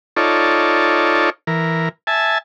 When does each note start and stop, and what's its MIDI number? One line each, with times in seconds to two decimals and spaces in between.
0.17 1.30 63
0.17 1.30 65
0.17 1.30 69
0.17 1.30 73
0.17 1.30 74
1.47 1.89 52
1.47 1.89 70
2.07 2.38 76
2.07 2.38 80
2.07 2.38 81